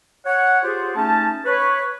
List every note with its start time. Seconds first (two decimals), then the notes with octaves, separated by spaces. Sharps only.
0.26 C#5 F#5
0.64 F4 G4 G#4 C5
0.96 A3 C#4 D#4 A5
1.46 B4 C#5